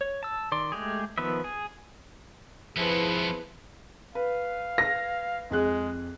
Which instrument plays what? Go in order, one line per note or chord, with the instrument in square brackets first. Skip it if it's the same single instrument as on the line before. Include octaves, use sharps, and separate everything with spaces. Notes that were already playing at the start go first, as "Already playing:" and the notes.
[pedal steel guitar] C#5
A5 E6
D#3 D5 C6
G#3 A3 G4 G#4
D#3 F3 B3 B4 E5
G#4 G#5
[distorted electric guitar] F2 B3 [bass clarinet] F3 [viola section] E4 G#4 B4
[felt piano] B4 [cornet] F5
[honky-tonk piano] A#6
[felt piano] F2 G#4 F#6 [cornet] G#3